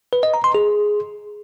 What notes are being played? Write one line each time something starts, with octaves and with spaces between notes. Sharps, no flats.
B4
D#5
A#5
C6
G#4